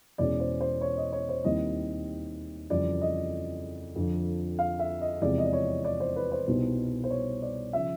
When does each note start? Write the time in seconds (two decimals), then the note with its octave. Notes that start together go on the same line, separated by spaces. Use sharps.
0.18 E2 B2 G#3 C#4 D5
0.40 C5
0.61 C5
0.81 C#5
0.97 D#5
1.13 C#5
1.29 C5
1.44 D#2 D#3 G3 C4 E4 D#5
2.70 F2 C#3 E3 G3 D5
3.01 D#5
3.96 F2 D3 F3
4.59 F5
4.79 E5
5.01 D#5
5.21 E2 C3 F3 G#3 D5
5.38 D#5
5.46 D5
5.53 C#5
5.84 D5
6.00 C5
6.16 B4
6.32 C5
6.47 C2 B2 G3 B3 D#4
7.04 C5
7.10 C#5
7.42 D5
7.73 C#3 F3 E5